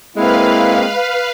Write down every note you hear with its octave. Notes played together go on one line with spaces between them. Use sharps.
G#3 A#3 C4 E4 B4 F5